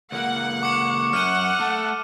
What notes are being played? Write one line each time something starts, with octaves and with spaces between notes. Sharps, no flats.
C#2 A#3 F#5
C#6 D6 C#7
F#2 F#5 F6 D#7
A3 A5